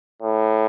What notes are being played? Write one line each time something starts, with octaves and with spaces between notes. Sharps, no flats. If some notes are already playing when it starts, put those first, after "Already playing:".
A2